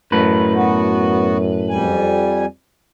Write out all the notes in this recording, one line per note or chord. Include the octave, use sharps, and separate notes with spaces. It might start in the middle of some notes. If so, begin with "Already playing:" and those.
F#2 A2 B4
B3 F#4
F2 G3 G#5